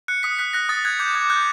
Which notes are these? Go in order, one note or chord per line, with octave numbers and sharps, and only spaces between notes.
F#6 C#7
D#6 B6
F#6 B6
F#6 A#6
D#6 A6
F#6 G#6
D6 G6
D6 G#6
F#6 G6